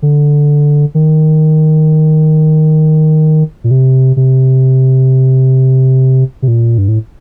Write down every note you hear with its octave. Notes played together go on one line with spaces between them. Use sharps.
D3
D#3
A#2
C3
C3
C3
A#2
G2
A2